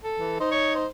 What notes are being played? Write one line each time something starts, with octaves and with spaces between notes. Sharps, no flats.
A4
E3
D#4 C5
C#5
C5